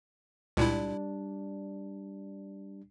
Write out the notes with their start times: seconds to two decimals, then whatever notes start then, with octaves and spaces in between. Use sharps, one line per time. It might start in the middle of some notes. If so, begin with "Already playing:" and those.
0.57 C#2 A#2 G3 D4 E4